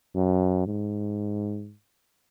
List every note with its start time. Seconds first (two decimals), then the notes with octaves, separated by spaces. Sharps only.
0.15 F#2
0.67 G#2